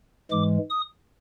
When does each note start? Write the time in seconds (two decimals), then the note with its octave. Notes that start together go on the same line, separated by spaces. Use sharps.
0.31 G#2 E3 G#3 D6
0.70 D#6